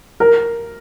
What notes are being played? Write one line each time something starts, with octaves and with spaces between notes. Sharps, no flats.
A#4